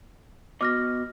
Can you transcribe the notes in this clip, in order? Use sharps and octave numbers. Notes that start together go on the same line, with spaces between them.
B3 F#4 D#5 D6 F6 A#6